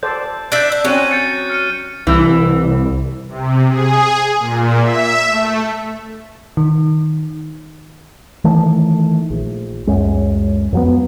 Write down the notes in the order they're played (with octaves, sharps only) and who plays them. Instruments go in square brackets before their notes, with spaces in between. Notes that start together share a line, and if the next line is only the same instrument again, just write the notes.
[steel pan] A4 C5 D5 [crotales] G6
[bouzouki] D4 E5 [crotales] F#6 G6
[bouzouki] D4
[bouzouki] F#3 [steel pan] C4 C#4 [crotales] F#6 D#7
[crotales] G6 A6 C#7
F6 C#7 D#7
[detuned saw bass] C2 [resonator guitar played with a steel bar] E3
[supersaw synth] C3
G#4
A#2
E5
A3
[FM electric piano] D#3
[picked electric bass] D#3 E3 A3
A#1
C#2 F#2 G#3
F2 F#3 B3